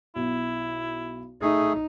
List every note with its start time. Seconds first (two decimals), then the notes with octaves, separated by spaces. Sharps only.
0.16 B1 E4
1.42 A3 D#4 G#4